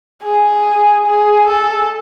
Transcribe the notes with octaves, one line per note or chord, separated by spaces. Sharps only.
G#4
G#4
A4